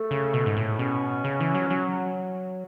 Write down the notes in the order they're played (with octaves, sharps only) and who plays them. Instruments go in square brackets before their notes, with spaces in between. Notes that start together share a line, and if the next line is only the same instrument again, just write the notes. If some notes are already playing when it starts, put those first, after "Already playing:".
Already playing: [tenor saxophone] A3
[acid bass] C#3
B2
G#2
A2
[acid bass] B2 [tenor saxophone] C#4
[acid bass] C#3
E3
F#3
F#3